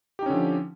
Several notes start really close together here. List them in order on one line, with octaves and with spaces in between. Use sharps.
G4 D#4 C#4 D3 F3